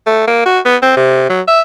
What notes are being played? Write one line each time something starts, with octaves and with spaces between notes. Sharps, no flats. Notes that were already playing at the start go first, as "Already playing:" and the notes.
A3
A#3
F#4
B3
C4
C3
F#3
E5